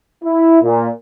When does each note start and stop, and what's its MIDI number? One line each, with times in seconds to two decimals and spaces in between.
0.24 0.61 64
0.62 0.87 46